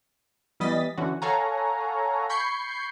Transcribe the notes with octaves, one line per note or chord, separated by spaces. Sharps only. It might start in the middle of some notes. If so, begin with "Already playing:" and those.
E3 G3 B3 D#5 A6 B6
D3 E3 C#4 F#4
A4 C#5 F5 F#5 G#5 A#5
B5 C#6 G6 G#6 C7 C#7